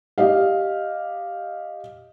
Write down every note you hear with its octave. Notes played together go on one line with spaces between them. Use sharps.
G4 D#5 F5